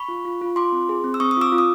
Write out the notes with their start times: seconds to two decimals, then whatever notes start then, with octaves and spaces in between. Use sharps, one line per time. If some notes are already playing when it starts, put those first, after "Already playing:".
Already playing: B5 C#6
0.08 F4
0.25 F4
0.41 F4
0.56 F4 C6 D6
0.72 C4
0.89 G#4
1.04 C4
1.14 E6
1.20 C4 C#6 D#6
1.31 D#6
1.37 F4 D6 E6
1.52 F4
1.58 D#6